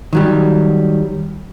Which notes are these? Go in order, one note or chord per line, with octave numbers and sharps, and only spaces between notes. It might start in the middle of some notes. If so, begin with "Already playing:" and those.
D#3 F#3 G3